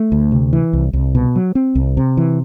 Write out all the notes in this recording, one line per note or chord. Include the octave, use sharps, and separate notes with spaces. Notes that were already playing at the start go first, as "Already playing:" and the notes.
Already playing: A3
D2
C3
E3
C2
C2
B2
F#3
C4
C2
C3
E3